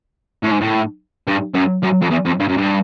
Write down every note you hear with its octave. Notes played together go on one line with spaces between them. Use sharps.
A2
G#2
A2
G2
F#2
F#2
F2
E2
F2
G2
F#2
G2